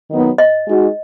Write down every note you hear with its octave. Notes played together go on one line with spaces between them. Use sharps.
D#3 F#3 B3 D#4
D#5
G#3 D#4 F#4